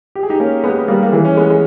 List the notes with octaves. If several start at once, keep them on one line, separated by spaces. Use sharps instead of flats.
G4
G#4
D#4 G4
A#3 C#4
G#3 B3
B3
G3 A#3
A#3
E3 G#3
C#4
G#3 B3
G#3